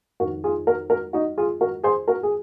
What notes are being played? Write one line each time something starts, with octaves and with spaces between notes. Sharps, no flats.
F2 D#3 F#4 A#4
F4 G#4
F#4 A#4
F#4 A#4
D#4 F#4
F4 G#4
F#4 A#4
G#4 C5
F#4 A#4
G#4